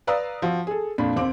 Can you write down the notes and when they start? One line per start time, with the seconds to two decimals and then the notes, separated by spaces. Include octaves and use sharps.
0.07 B4 D5 F5 A#5 D#6 E6
0.42 F3 F#4
0.67 G#4 A4
0.98 F2 A#2 D4 B5
1.16 D#2 C4 D6